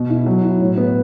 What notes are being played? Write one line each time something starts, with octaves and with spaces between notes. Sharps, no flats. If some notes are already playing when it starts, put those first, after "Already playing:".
Already playing: B2
E4
F#3
E4
A2
B3